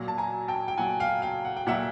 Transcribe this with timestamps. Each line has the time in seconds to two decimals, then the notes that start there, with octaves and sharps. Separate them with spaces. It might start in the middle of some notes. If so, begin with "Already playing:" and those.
Already playing: A#2 F#3
0.08 A5
0.18 G#5 A#5
0.48 G5 A5
0.68 G5
0.78 A#2 F#3 F#5 G#5
1.00 F5 G5
1.22 F5 G5
1.45 F#5
1.57 G5
1.67 A#2 F#3 E5 F#5